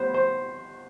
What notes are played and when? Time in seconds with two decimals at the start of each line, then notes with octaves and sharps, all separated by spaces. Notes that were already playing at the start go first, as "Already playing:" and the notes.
Already playing: A2 G3 B3 C5
0.14 C5